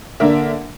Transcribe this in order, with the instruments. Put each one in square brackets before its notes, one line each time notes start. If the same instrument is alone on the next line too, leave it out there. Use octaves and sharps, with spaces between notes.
[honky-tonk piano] D3 A#3 D4 A#4 E5